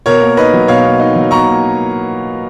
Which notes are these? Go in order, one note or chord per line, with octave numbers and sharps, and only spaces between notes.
B2 A#4 C#5
A#3
D#4 B4 D#5
F#3
B2 C#5 F5
A#3
D#4
F#3
B2 A#5 C#6
A#3